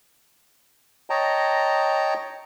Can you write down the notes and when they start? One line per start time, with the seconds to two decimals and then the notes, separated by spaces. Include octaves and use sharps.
1.10 C#5 D#5 G5 A5 A#5